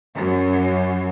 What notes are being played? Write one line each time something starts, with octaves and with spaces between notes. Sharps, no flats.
F#2